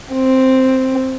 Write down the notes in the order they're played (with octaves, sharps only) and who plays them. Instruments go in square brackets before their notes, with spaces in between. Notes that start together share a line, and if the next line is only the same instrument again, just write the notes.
[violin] C4